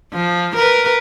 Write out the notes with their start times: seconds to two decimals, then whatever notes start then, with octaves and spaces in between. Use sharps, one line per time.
0.13 F3
0.56 A#4 B4